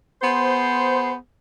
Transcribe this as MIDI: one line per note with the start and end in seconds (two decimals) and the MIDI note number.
0.22 1.14 59
0.22 1.14 68
0.22 1.14 72